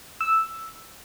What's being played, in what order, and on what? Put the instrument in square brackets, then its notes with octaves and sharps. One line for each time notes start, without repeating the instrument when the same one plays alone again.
[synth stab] E6